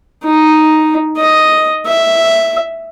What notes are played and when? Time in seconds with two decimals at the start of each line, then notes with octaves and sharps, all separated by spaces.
0.25 D#4
1.18 D#5
1.87 E5